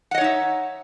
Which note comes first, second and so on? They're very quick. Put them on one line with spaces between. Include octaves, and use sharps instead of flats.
F#5 D#5 C#5 D#4 E5